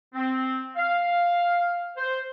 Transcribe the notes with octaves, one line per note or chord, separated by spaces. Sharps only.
C4
F5
C5